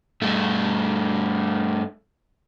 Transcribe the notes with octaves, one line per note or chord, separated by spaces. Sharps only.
G2 A3